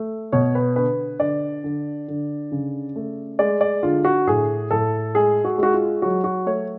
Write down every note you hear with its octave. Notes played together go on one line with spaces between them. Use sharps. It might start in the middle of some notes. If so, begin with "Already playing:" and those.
Already playing: A3
B2 C#5
B4
D3 B4
D3 D5
D3
D3
C#3
A3
G#3 D5
D5
D3 F4
F#4
A2 G#4
A2 A4
G#3 G#4
F#4
G#3 F#4
F4
F#3 F#4
F#4
A3 C#5